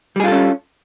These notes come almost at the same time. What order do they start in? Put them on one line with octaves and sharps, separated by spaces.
G3 G#4 F4 A4 C#4